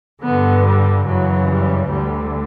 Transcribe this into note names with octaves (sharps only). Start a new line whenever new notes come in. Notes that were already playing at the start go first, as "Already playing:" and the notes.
G2 D3 B3
G3
F#2 C#3 E3 F#3
G3
D2 D3 G3